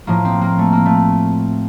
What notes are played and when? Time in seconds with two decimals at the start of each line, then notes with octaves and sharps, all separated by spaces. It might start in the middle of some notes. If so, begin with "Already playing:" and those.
0.07 A2 F3 A#3
0.25 C4
0.41 A#3
0.59 A3
0.72 A#3
0.86 A3